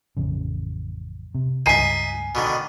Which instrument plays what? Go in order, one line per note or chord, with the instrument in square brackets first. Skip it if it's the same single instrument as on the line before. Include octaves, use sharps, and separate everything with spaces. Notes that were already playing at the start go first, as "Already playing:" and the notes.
[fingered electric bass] A1 F2 C#3
C3
[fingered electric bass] C#2 G2 [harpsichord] D#4 E5 [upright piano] G#5 C7 D#7
[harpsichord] B2 D3 D#3